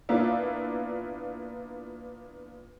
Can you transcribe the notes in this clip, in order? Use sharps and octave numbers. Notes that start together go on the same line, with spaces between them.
A#2 A#3 B3 D4 E4 F4